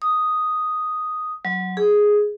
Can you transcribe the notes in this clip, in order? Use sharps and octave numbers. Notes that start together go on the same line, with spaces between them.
D#6
F#3
G#4